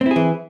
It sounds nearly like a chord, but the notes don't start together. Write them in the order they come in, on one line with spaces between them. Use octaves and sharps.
C4 E4 G#4 E3